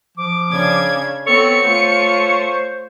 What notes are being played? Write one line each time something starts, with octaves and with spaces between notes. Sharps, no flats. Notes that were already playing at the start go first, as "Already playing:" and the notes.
F3 D6
C#3 D4 G#6
B3 C4 F#4 A4 C#5 C#7
A3 F4 C5